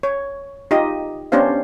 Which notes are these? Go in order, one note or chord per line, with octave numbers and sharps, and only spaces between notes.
C#5
D#4 F4 G4 D#5
B3 C#4 D4 G4 C5 F5